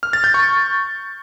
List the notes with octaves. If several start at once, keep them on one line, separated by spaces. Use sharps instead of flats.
F6
A6
G6
C#6